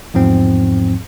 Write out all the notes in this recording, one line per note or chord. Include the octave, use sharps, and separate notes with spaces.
E2 G#2 F3 C4